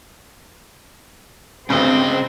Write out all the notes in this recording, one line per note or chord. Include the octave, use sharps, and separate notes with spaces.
D2 G2 C#3 C4 D#5